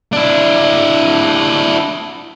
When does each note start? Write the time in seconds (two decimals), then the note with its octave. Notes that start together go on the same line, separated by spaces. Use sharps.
0.13 D4 E4